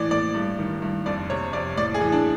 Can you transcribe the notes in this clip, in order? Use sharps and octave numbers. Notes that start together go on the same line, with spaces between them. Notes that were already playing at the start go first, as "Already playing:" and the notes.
Already playing: A2 E3 D5
A2 D5
G2
D#3
G2
F2 D5
C3 C#5
F2 D5
A2 D5
G#4
E3
D4